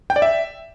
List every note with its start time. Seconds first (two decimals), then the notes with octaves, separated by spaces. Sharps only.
0.10 G5
0.16 D5
0.22 E5